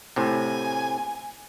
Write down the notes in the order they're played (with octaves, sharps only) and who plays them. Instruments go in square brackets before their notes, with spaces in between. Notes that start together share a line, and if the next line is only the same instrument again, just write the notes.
[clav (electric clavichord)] A2 C3 [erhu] G#5